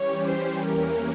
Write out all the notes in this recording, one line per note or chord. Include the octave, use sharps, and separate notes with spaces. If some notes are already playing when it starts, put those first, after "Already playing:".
Already playing: E3 G3 C#4 G4 C#5
C5
E2 E3 A#3 C#4 A#4